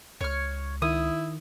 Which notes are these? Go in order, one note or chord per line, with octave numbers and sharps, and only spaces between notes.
C#2 C#5 F6
D#3 E4 D#6